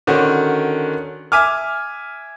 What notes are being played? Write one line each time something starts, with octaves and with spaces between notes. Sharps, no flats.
D3 D#3 C#4 F#4
E5 G#5 D6 F6